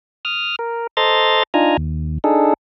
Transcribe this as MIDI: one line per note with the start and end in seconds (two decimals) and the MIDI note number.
0.25 0.56 87
0.25 0.56 89
0.59 0.87 70
0.97 1.43 69
0.97 1.43 72
0.97 1.43 75
0.97 1.43 82
0.97 1.43 84
0.97 1.43 93
1.54 1.77 62
1.54 1.77 63
1.54 1.77 65
1.54 1.77 80
1.54 1.77 82
1.77 2.18 39
2.24 2.53 62
2.24 2.53 63
2.24 2.53 68
2.24 2.53 69